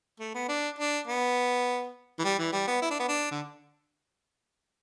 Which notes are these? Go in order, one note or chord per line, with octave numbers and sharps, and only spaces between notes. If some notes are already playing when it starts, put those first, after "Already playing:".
A3
B3
D4
D4
B3
E3
G3
E3
G3
B3
E4
D4
B3
D4
D3